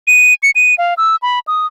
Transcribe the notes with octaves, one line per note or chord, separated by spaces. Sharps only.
D#7
C#7
D#7
F5
E6
B5
D#6